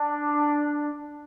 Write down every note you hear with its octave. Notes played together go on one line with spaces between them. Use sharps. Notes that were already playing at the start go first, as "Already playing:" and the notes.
Already playing: D4